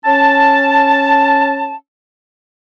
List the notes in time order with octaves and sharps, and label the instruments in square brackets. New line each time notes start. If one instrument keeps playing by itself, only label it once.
[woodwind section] C#4 A5